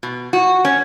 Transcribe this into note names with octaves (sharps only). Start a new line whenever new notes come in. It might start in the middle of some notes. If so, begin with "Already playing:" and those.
B2
F#4
C#4